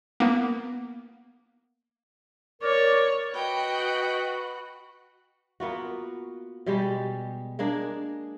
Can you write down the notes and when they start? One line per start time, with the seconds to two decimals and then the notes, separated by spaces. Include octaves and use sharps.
0.20 A#3 B3
2.62 A#4 C#5 D5
3.34 F#4 B4 D#5 G5
5.60 A#3 B3 F4 F#4
6.66 B2 G3 G#3 G4
7.59 G#3 A#3 D4 G#4